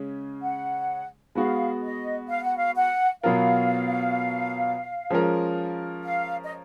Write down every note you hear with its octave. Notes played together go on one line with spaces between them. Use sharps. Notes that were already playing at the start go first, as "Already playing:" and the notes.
Already playing: C#3 G#3 C#4
F#5
G#3 B3 F#4 F5
D#5
F5
F#5
F5
F#5
B2 F#3 B3 F4 A#4 F5
F3 G#3 C#4 F4 A#4
F5
D#5